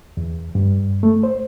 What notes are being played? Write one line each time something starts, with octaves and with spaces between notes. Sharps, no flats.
E2
G2
A3
C5